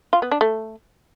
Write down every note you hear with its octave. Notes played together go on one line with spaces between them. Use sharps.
F4
B3
D4
A3